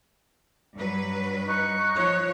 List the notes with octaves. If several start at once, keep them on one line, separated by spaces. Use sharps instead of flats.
G2 F#3 B4
D#4 C#6 F#6
F3 C#5